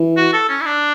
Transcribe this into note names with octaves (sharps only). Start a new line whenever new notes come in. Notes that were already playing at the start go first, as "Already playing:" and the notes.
Already playing: E3
F#4
A4
C#4
E4
D4